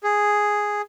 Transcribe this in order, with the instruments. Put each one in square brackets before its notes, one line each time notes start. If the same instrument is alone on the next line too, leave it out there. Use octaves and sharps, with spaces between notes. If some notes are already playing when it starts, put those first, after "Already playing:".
[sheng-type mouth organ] G#4